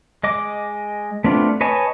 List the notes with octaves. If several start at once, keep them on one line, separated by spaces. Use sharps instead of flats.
G#3 D#5 D6
A3 B3 C4 D4 F4
B4 C#5 D#5 G#5 A5